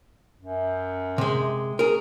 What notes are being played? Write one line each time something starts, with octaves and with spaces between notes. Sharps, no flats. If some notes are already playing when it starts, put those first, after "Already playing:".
F#2
C3 G#3
C#4 G#4 A#4